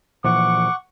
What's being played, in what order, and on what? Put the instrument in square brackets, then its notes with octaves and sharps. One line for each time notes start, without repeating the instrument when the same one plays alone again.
[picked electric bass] A#2 E3 F3 [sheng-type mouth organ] F#5 C#6 [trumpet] D6